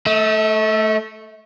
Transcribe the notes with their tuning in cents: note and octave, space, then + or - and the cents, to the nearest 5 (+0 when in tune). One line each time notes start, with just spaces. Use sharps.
A3 +0 E5 -45